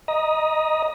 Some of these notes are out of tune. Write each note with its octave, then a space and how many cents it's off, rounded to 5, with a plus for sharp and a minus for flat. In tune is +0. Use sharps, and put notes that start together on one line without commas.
D#5 +0 A#5 +25